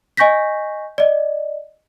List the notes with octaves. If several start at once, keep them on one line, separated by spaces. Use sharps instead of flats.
D#5 G#5 C#6 G6 A#6 B6
D5 D#5